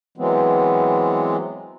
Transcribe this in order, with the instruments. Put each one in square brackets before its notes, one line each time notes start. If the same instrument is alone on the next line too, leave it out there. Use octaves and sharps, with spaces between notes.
[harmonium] E3 F#3 G#3 B3 C4